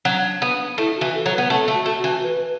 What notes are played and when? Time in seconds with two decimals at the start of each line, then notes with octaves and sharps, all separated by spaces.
0.05 F#3 D4
0.20 D4
0.42 B3
0.77 A3 E4
0.95 F#4
1.01 E3
1.13 A4
1.26 F#3
1.32 B4
1.38 B3
1.50 A3 A4
1.68 A3
1.73 F#4
1.86 A3
1.97 F#4
2.04 E3
2.22 B4